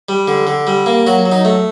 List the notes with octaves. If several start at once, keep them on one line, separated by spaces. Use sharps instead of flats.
G3
D3
D3
G3
A#3
F#3 F#4
F#3
D#4
A3